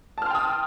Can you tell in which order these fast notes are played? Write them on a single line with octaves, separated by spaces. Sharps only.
A5 F6 C6 G5 D#6